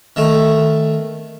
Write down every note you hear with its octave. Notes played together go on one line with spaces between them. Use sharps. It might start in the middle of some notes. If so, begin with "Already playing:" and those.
D#3 A3